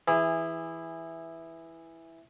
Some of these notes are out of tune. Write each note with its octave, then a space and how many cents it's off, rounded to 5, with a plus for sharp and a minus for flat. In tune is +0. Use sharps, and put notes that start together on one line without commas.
E3 +0 G#4 -25